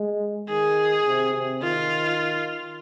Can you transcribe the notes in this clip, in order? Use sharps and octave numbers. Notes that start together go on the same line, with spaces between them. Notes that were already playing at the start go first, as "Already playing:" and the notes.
Already playing: G#3
D#3 G#4
C3
C3
D#3 F4